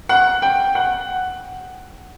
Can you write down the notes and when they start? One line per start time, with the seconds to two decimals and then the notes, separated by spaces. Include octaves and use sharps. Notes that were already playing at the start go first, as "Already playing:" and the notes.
0.09 F#5
0.42 G5
0.75 F#5